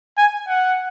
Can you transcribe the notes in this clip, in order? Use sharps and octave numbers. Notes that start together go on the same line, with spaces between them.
G#5
F#5